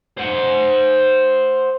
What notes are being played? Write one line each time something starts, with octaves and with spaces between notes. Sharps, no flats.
C5 F#5